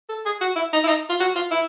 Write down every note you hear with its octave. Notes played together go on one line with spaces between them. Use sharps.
A4
G#4
F#4
E4
D#4
E4
D#4
F4
F#4
F4
E4